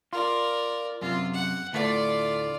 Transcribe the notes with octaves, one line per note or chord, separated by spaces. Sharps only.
F4 A#4 D5
F#2 C3 F4
F#5
D2 A2 A3 F4 D5